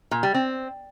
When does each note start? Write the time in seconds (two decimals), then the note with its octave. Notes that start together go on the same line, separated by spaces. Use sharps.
0.11 A#2
0.23 G3
0.34 C4